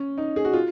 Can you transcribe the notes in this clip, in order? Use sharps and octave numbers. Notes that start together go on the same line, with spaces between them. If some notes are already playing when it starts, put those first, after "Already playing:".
Already playing: C#4
D#4
G#4
F#4
F4